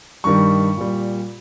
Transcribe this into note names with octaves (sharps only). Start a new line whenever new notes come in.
G2 D#3 G3 C#6
A#2 G3